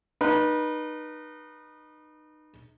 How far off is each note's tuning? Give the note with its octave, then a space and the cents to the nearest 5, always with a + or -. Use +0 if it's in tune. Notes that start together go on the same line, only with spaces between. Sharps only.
D#4 -25 B4 -30